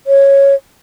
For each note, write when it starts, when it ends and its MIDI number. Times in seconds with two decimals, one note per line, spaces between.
0.07 0.55 73